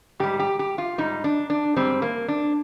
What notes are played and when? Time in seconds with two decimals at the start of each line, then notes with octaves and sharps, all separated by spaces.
0.20 G#2 G3 G4
0.40 G4
0.59 G4
0.78 F4
0.98 G#2 G3 D#4
1.24 D4
1.50 D4
1.76 G#2 G3 C4
2.02 A#3
2.28 D4